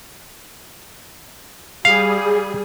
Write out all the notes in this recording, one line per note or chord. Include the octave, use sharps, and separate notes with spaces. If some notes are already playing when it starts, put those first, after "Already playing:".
G3 G#4 F5